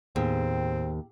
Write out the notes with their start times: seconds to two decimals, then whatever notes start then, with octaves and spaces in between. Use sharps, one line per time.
0.16 D#2 A2 B3 C4 G#4